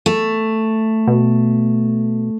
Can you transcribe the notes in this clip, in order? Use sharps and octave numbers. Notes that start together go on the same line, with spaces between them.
A3
B2